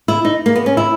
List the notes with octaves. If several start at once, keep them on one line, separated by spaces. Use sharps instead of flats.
E4
D#4
A#3
B3
C#4
E4